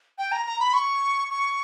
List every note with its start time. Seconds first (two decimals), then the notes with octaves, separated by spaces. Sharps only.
0.18 G5
0.32 A#5
0.46 A#5
0.60 B5
0.74 C#6
1.30 C#6